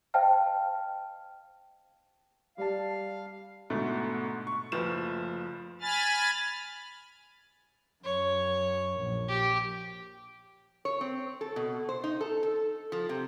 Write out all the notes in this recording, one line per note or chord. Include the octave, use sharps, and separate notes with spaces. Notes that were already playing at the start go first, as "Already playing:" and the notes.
C5 D#5 F5 G5 A5 F6
G3 D5 F5 A5
G#2 B2 D3 A3
C#6
F#1 F3 A3 B4 E7
G#5 B5 F6 A6
F#2 C#5
A#1
G4
C#5
C4
A4
B2
C5
D#4
A4
A4
F3
C3